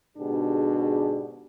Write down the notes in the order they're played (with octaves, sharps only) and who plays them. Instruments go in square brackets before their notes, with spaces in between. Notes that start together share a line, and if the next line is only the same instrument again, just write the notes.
[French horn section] G#2 B2 D3 D4 G4 G#4